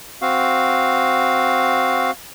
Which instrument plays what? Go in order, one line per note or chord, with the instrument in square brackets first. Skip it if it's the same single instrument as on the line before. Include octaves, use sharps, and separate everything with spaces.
[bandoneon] C4 F#4 F5